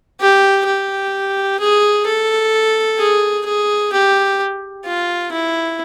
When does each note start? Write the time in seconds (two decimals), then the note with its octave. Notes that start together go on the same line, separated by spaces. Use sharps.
0.20 G4
0.66 G4
1.59 G#4
2.06 A4
2.99 G#4
3.46 G#4
3.93 G4
4.85 F4
5.32 E4